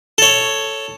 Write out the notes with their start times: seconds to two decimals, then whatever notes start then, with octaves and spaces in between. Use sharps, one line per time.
0.18 A4 C#5